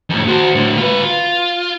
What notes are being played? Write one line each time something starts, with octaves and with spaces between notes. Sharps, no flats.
F2 A2
F#4 C5
A2 D3
F4 B4
F4